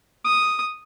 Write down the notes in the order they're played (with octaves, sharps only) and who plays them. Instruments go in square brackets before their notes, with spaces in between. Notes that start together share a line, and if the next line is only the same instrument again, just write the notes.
[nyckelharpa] D#6